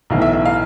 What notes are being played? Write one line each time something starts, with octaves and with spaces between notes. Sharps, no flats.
B1 A2 E3 F5
E5
E5
F5